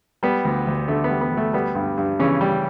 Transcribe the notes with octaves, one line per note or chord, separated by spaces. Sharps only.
G3 B3
D2
D2
D3 A3
B3
G3
B3
D2
A3
G3 B3
G2
G2
C#3 E3 C#4
G3